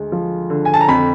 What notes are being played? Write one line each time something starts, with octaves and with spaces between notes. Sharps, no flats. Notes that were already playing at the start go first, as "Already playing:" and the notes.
Already playing: D2 G#3
F3
D3
G#5
A5
A#5
F2 B5